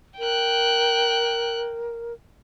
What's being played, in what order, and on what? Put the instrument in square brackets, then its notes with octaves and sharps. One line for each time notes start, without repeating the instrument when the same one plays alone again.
[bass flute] A#4 [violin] G5 F#6